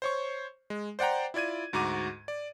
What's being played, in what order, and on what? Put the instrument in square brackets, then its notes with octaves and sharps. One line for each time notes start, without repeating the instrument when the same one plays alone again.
[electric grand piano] C5 C#5 C#6
G#3
C5 D5 F#5 G5 A#5
E4 F4 D5 G#6 D#7
D2 G#2 F#4 A#5 D6 D#7
D5